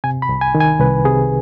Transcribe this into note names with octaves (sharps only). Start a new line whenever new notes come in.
C3 G#5
B5
C2
G#5
D#3
G#5
C2 B4
C3 G#4